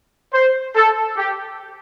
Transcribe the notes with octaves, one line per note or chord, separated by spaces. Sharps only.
C5
A4
G4